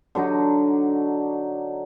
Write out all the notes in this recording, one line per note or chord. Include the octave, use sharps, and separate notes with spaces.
D3 F#3 D4 D#4